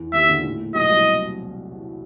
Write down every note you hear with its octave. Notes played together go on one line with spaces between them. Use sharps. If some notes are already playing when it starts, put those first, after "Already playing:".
Already playing: E2 E3
D#2 D#3 E5
D2 D3
A#2
A2
A#2
B1 B2 D#5
C2 C3